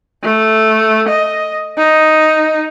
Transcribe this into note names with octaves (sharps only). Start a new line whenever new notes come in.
A3
D#5
D#4